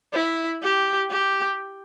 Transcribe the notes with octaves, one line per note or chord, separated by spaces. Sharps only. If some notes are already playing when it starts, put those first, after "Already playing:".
E4
G4
G4